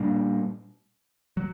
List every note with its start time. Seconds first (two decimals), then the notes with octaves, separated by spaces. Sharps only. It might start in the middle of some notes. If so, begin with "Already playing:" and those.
Already playing: A#2 G3 A#3 D4
1.37 F#3